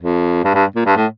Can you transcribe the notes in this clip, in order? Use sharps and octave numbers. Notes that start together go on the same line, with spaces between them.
F2
G2
G2
A#2
G2
A2